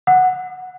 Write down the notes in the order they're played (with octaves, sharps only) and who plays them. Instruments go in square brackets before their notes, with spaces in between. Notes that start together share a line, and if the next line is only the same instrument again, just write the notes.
[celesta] F#5